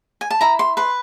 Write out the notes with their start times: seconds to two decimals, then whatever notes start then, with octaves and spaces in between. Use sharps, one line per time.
0.21 G#5
0.30 A5
0.41 E4 A#5
0.59 C6
0.77 B4 C6